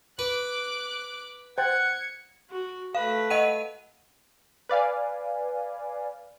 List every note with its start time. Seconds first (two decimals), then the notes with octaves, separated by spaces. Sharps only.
0.19 B4 D6 F#6
1.58 C5 F#5 G5 G#6 A6 C#7
2.50 F#4
2.95 A3 B4 F5
3.30 D#5 F#5 D#7
4.69 B4 D5 F5 G#5